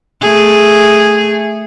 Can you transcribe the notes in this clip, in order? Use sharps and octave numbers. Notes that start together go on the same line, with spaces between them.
A3 G#4